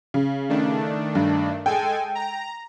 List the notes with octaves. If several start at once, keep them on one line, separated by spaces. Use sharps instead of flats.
C#3
D#3 A3 D4
G2
G#3 A4 G5 G#5
A#5